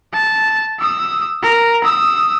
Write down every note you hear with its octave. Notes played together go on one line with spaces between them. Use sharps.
A5
D#6 E6
A#4
D#6 E6